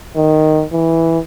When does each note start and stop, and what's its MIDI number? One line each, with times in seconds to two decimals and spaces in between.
0.15 0.63 51
0.72 1.19 52